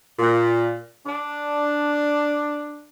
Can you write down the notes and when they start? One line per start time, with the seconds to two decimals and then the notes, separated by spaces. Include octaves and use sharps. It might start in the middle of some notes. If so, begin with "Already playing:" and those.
0.19 A#2
1.06 D4